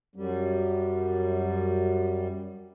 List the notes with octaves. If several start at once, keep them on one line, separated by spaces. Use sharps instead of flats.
F#2 G3